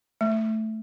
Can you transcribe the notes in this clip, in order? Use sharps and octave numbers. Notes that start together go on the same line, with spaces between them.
A3